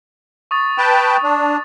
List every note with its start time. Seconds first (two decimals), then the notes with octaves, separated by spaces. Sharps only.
0.51 C#6 D#6 A6
0.78 B4 G5 A5
1.23 D4